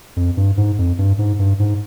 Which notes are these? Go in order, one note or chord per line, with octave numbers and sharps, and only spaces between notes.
F2
G2
G#2
F2
G2
G#2
G2
G#2